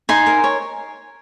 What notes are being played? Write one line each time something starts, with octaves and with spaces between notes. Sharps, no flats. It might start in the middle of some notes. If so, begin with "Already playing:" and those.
D#4 G#5 C6
A#4
C#5